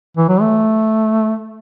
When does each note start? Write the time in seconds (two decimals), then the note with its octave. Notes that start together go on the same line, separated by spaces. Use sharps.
0.17 E3
0.29 F#3
0.41 A3